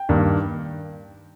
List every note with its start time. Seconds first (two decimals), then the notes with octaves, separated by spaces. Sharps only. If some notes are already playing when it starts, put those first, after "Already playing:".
Already playing: G5
0.09 G2 D#3 A#3